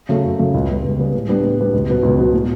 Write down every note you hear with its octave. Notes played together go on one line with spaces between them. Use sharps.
C#3 F#3 A3
F#2
C#3 F#3 A3
C#2
C#3 G3 B3
C#2
C#3 G3 B3
A2
G3 B3 D4 G4
A2
G3 B3 D4 G4
C#2
B2 F#3 B3
C#2
B2 F#3 B3
A2